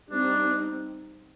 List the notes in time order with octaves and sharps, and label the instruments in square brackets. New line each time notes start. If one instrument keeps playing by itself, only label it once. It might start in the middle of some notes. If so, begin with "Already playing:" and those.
[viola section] G3 C4 D#4 [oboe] D4